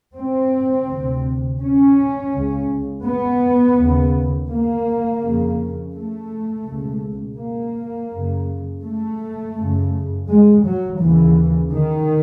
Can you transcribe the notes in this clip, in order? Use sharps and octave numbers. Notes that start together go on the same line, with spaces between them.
C4
D2 C3
C#4
C#2 C#3
B3
D#2 C#3
A#3
F2 C#3
A3
C#2 B2
A#3
F#2 C#3
A3
F#2 C#3
G#3
F#3
D#2 C#3 E3
D#3